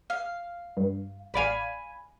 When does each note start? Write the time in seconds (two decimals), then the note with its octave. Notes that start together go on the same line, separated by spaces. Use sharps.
0.10 F5
0.77 G2
1.34 A1 D5 F5 G#5 B5